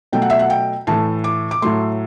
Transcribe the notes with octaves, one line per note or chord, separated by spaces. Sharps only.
B2 F#3 A3 G5
F#5
E5
F#5
G5
A2 E3 A3 A5
D6
D6
A2 F#3 A3 C6